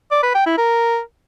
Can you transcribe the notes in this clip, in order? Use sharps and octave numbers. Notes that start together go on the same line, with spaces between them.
D5
B4
G5
E4
A#4